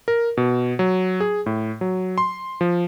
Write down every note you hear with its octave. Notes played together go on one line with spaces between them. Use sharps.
A#4
B2
F#3
G#4
A2
F#3
C6
F3